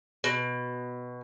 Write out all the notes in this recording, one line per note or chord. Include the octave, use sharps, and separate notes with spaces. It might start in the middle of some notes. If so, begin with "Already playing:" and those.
B2